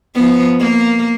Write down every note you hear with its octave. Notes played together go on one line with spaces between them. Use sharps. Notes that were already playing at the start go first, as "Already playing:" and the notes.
F3 B3
A#3